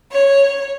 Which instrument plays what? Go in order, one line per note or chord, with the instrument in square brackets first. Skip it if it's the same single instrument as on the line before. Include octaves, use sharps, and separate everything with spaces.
[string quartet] C#5